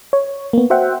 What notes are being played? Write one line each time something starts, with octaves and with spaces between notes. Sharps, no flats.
C#5
A#3 B3
F#4 C5 E5 F#5 G5